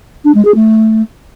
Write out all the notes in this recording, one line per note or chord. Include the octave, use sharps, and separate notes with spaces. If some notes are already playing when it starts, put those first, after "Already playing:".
D4
G#3
G#4
A3